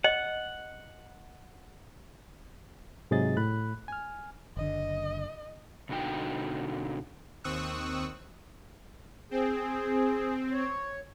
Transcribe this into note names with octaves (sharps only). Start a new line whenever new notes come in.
D#5 F#5
G#2 C3 F#3 G#4 D#5 A6
A2 B5 F#6
G#5 F6
F#1 D3 D#5
B2 D3 D#4 F#4 G5
D#2 C4 C#6 D#6 E6 F#6
C4 G#4
C#5